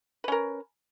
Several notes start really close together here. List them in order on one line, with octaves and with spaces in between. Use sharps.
B4 C#4 A#4